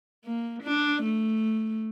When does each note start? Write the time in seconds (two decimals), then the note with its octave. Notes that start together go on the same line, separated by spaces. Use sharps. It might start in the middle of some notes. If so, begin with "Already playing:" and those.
0.25 A#3
0.63 D4
1.03 A3